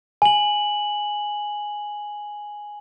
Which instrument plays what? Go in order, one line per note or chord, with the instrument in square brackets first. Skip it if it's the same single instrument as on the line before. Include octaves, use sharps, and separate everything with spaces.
[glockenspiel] G#5 F#7